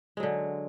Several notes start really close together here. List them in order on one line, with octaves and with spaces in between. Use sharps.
G#3 F#3 D3